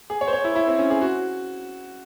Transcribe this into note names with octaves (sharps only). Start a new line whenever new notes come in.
G#4
C#5
C5
C#5
E4
E4
C4
C#4
G#4
F#4